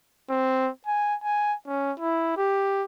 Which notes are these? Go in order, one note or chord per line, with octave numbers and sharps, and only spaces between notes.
C4
G#5
G#5
C#4
E4
G4